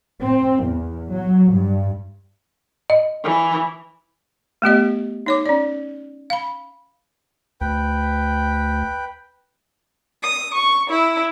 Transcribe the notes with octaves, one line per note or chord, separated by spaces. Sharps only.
C4
E2
F#3
G2
D#5
E3
A3 B3 G4 D#5
D#4 C#5 D6
C#4 D5
F5 B5
D2 B4 G5
D#6
C#6
E4